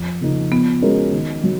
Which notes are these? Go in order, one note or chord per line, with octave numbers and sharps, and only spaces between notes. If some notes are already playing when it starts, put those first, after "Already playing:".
Already playing: F2
C#3 F3 A#3 D#4
F3 B3
G#3 C#4 F#4 A#4
D#3
F#3